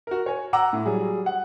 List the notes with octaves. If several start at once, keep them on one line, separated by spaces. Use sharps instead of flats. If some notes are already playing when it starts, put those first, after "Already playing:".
F#4 A#4
C#5 G#5
F#5 A#5 D6 E6
A2
F#3 G3 G#4
F#5